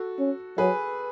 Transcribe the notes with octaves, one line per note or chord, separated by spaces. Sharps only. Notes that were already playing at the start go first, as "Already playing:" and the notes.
Already playing: F#4 A4
C#4
F#3 G#4 B4